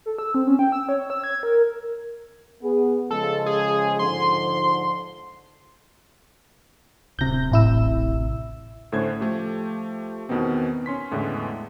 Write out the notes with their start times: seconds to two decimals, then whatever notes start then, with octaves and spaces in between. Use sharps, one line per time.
0.06 A4
0.19 E6
0.35 C4
0.47 C#4
0.59 G5
0.72 E6
0.89 C#5
1.10 E6
1.24 G#6
1.43 A#4
2.62 B3 G#4
3.11 C#3 F3 G#3 A4
3.46 G#4
3.99 G#2 D3 F3 C6
7.19 D1 C3 G6 A#6
7.52 A1 E4 E6
8.92 A2 D3 A3 C#4 C5 G#6
9.21 F3 A3 G4
10.29 E2 B2 D#3 B3 C4
10.86 C#4 C6 B6
11.11 E2 A2 D3 E3 G#3